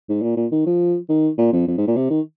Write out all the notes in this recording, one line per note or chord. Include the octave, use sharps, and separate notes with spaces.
G#2
A#2
A#2
D#3
F3
D#3
A#2
F2
F2
G#2
A#2
C3
D#3